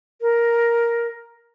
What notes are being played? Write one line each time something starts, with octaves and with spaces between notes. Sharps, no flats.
A#4